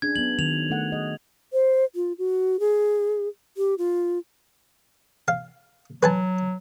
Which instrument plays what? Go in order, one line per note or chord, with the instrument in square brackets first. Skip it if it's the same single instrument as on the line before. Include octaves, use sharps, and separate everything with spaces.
[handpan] C#4 D4 G#4 [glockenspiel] G#6
[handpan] F#3 B3 [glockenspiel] F#7
[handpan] D#3 F#3 [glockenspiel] F7
[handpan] A3 F#4 F#5
G#4 D#5
[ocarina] C5
F4
F#4
G#4
G4
F4
[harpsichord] F5
[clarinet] F#3 [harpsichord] B4 G#5 A5